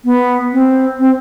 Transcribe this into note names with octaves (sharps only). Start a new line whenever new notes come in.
B3
C4
C4